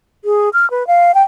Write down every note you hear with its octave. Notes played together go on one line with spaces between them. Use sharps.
G#4
F6
B4
F5
G5